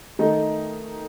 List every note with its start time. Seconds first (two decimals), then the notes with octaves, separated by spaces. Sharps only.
0.19 D#3 A3 D#4